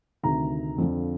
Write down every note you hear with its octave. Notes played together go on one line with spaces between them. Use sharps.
D2 C3 D#3 A#5
F2 D3 F3